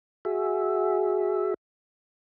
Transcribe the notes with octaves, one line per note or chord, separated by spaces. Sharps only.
F#4 G#4 E5